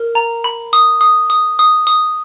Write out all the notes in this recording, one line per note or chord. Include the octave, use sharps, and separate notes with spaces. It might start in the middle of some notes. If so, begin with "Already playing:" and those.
Already playing: A#4
A#5
B5
D#6
D#6
D#6
D#6
D#6